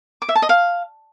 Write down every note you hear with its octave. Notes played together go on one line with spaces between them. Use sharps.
D6
E5
A5
D#5
F5